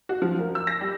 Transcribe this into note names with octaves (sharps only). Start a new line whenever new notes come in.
F#4
F3
A#4
E6
A#6
G3